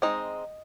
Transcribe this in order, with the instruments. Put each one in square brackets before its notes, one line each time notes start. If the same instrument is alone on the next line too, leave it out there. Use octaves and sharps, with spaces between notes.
[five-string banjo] G#3 C4 D#4 D#5